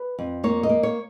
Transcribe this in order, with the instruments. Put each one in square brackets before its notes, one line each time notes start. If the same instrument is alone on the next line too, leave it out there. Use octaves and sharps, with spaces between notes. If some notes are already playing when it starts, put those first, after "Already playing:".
Already playing: [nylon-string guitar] B4
F2
A#3 C#5
D#5
A#3
C#5